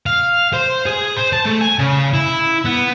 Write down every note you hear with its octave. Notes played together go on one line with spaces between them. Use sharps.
F5
C5
G#4
C5
A5
A3
G#5
C#3
E4
B3